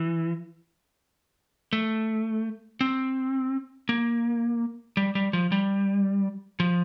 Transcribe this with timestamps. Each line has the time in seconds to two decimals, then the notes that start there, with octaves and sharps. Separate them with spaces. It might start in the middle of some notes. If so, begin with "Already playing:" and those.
Already playing: E3
1.73 A3
2.81 C4
3.89 A#3
4.97 G3
5.15 G3
5.33 F3
5.52 G3
6.60 F3